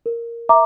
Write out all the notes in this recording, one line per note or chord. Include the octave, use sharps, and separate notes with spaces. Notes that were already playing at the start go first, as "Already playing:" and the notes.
A#4
E5 A#5 D6